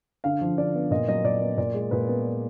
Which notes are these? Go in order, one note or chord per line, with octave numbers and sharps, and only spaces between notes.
D3 F5
F3
D3 D5
B3
A#2 D#5
F#3 D#5
A#2 D5
B3
A#2 D5
G#3
A#2 B4
B3